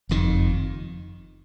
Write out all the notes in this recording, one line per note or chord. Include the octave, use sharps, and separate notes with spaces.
F#1 F2 D#3